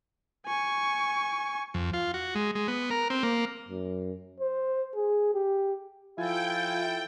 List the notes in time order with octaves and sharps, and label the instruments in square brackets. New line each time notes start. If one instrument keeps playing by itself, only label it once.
[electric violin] G#5 C#6
[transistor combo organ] F2
F4
F#4
G#3
G#3
B3
A#4
C4
A#3
[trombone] F#2
C5
G#4
G4
[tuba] F3 [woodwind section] E4 A4 [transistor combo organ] F4 G#5 [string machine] G5